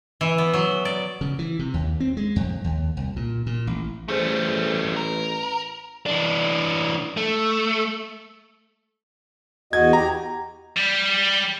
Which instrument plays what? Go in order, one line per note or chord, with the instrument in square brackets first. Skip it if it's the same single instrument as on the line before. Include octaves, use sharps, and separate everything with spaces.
[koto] E3
B3
F#3
D5
[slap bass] C#3
E3
C3
D#2
C4
G#3
F2
D#2
C2
A#2
A#2
A1
[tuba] A1 [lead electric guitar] G3 A3 [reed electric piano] G#4 C5
[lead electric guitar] A#4 [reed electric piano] B4
[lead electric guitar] E3 D4
A3
[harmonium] E2 F#4 D#5 [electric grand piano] G#6
[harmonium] G4 [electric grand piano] A#5
[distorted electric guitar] G3